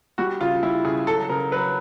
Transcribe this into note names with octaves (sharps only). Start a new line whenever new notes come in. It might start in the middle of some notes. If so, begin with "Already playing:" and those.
G3 F#4
C#3 F4
G3 E4
C#3 G#4
F#3 A4
C#3 A#4
F#3 B4